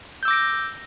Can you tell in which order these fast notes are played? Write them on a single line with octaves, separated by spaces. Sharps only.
G6 E6 D6 A#6 D7